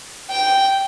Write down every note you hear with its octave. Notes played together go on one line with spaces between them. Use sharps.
G5